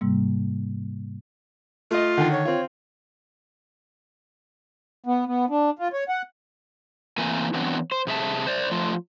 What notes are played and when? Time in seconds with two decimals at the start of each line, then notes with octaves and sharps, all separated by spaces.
0.01 G#2 C3 G3 A#3
1.91 A3 F4 D#5
2.18 D3 D#3
2.32 C#5
2.45 C4 F4
5.06 B3
5.26 B3
5.50 D4
5.79 F4
5.93 C#5
6.09 F#5
7.18 E3 A3 A#3 C4 A#4 G#5
7.54 E3 F#3 B3 C4 D4
7.91 C5
8.07 C3 G#4 E5 A5
8.47 C5 D5
8.71 F3 A3 F4